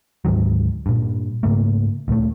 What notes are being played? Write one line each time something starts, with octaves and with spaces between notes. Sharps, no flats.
D2 G#2 D#3 F#3
G2 A#2
G#2 C#3 A3 A#3
D2 A#2 A3